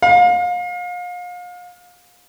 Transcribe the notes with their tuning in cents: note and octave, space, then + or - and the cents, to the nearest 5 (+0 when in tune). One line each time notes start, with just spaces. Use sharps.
F5 +35